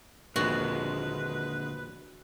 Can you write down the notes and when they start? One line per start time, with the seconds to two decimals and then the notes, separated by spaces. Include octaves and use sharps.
0.36 A#1 D#2 D3 G#3 B3 F#4 B4